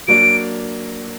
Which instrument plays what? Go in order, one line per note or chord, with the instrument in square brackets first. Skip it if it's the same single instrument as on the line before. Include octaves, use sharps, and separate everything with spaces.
[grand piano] F#3 A#3 D4 [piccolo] D7